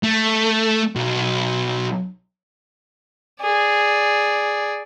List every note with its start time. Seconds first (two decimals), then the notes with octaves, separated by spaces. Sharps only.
0.03 A3
0.96 B1
3.42 G#4 D5